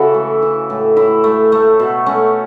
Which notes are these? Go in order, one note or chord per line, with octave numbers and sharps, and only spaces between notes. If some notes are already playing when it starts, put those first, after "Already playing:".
Already playing: C#3 E3 E4 F#4 A4
A3
E3
A2
A2 E4
A3
A3
B2
A3 C#4